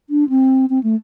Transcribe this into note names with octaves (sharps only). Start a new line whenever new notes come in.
D4
C4
C4
A3